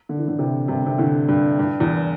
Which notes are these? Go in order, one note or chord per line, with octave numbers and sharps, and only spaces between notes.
D3
E3
A2 D3
C3 E3
G2 C3
C3
A2 D3
G2
G2
E2